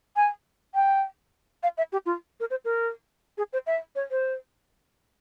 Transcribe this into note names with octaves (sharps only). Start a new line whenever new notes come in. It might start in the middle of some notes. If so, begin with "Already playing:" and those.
G#5
G5
F5
E5
G4
F4
A#4
C5
A#4
G#4
C5
E5
C#5
C5